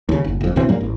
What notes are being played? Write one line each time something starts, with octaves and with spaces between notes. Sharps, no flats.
D#2 C#3
F#1
F#1 F2
D#2 B2 E3 C4
G2 F#3 G3 A#3
A1